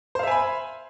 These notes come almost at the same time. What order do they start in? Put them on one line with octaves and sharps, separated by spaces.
C5 F5 E5 G#5 B5